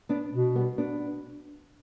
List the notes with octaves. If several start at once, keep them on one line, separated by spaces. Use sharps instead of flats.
B3 D4
B2
G3 B3
B3 D4